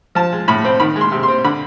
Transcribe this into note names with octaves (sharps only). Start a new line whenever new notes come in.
F3 A5
G#3
A2 B5
C4
D#3 B5
G#3
C6
C3
C6
C4
D3 B5